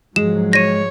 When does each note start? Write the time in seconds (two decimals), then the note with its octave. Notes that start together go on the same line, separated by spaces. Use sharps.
0.16 G#2 F3 F#3 G#3 E7
0.53 C#5 A#6 D#7